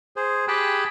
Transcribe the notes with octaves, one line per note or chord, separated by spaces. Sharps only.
G#4 C5
G4 G#4 G5 A5 B5 F#6